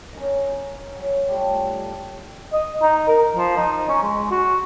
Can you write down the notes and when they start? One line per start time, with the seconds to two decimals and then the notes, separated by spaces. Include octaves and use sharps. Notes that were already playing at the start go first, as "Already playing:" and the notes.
0.13 C#4 D#4 A#4 D#5
0.96 F#3
1.28 G3 A3 F4 C#5
2.53 D#5
2.82 D#4
3.08 A#4
3.36 F3
3.57 D#4
3.89 C#4
4.03 G#3
4.31 F#4